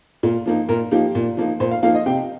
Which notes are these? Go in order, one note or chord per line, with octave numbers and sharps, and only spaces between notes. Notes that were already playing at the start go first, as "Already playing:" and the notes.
A#2 F4
F3 A#3 D#4
A#2 A#4
F3 A#3 D#4 G4
A#2
F3 A#3 D#4
A#2 C5
F5
F3 A#3 D#4 F5
D#5
C3 G5